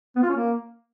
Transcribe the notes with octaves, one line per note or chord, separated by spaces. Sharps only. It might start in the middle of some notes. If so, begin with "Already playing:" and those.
B3
F4
C#4
A#3